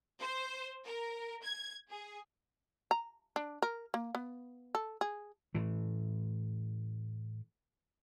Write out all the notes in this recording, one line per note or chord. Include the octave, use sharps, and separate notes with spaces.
C5
A#4
G#6
G#4
A#5
D4
A#4
A#3
B3
A4
G#4
A2 E3